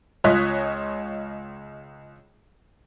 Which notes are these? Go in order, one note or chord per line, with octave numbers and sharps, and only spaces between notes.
C#2 F4 C#5 D#5 F#6 B6